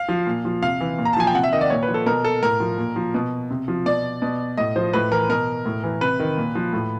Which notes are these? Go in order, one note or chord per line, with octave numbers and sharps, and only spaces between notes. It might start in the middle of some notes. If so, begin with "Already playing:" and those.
Already playing: F5
F3
A#2
F3
C3 F5
E3
A#2
A#5
A5
F3 G#5
G5
C3 F#5
E5
D#3 D#5
D5
A#2 C#5
B4
F3
A4
B2 A#4
A4
A2 A#4
F3
A#2
F3
B2
C3
F3
B2 D5
B2
A2 D#5
F3 C5
A2 B4
E3 A#4
B2 A#4
A2
E3
C3 B4
D#3
A#2
F3
A2